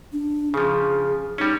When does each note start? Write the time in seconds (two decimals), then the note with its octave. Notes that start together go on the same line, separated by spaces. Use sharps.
0.13 D4
0.54 C#3 F3 G#4
1.38 G3 C#4 D#4